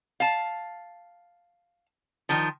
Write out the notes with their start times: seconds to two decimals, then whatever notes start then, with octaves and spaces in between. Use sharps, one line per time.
0.20 F5 A5
2.29 D#3 F3